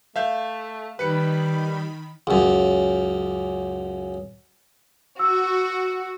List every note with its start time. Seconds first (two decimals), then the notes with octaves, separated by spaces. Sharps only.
0.16 A3 E5 F5 G6
0.99 D#3 G3 B4 B5 C#7
2.27 C#2 F#2
5.19 F#4 E6